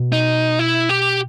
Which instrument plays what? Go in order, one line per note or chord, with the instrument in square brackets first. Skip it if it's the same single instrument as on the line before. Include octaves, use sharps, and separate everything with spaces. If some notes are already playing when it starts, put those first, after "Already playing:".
Already playing: [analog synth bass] B2
[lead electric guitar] D#4
E4
G4